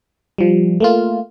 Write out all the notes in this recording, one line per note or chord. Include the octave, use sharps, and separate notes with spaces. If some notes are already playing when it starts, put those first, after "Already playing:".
F3 G3
A3 A#3 F4